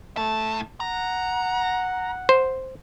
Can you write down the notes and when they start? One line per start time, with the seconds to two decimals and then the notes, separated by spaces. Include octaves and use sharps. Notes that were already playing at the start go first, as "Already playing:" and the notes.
0.17 A2 A3 A5
0.80 F#5 A#5
2.29 C5